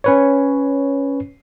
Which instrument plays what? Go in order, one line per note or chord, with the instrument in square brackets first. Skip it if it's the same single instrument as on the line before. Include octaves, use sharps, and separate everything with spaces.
[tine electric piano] C#4 B4 C#5